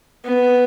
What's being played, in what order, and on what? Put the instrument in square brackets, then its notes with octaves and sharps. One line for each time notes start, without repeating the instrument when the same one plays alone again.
[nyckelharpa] B3